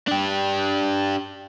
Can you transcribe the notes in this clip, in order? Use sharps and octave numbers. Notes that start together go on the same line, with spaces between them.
D4 G4